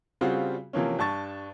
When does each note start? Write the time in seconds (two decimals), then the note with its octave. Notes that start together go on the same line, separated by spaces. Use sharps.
0.21 C#3 G3 C4 F4 F#4 G#4
0.73 C3 E3 F3 A#3 C#4
0.99 G2 A5 C#6 A6